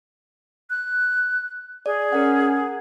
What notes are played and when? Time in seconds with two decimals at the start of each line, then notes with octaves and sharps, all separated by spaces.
0.70 F#6
1.86 G#4 D5
2.12 C#4 A#4 F#5